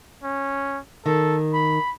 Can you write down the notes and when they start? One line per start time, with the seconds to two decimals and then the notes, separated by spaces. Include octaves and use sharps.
0.24 C#4
1.06 D#3 A4
1.54 B5